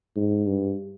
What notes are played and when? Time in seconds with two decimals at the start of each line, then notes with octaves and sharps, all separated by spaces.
0.16 G#2
0.47 G2